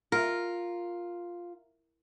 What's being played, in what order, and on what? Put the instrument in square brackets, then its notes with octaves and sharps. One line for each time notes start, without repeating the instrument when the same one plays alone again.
[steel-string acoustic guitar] F4 [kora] A#4